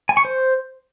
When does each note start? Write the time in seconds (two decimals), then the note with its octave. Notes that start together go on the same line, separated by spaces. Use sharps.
0.09 G#5
0.17 C#6
0.25 C5